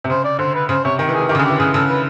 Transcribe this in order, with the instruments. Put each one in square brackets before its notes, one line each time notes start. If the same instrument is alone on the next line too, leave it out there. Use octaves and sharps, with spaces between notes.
[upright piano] C3
[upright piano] C#3 [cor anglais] C5
[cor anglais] D5
[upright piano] D3 [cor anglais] C5
[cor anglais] B4
[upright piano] C#3 [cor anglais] C5
[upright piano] C3 [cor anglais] C#5
[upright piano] D#3
E3
[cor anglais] G#4
[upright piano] E3
[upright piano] D#3 [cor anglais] G4
[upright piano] C#3
[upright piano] D3 [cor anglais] G#4
[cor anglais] G4
[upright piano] E3
[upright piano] C#3 [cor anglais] G#4
[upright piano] C#3 [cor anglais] A4
[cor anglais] B4